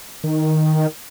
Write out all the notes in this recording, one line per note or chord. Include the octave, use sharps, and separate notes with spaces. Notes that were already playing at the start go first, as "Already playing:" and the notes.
D#3